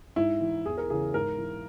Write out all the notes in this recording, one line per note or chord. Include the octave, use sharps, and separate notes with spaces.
G#2 E4
E3
E2 G#4
A#4
C#3 E3 G#4
G#2 A#4
E3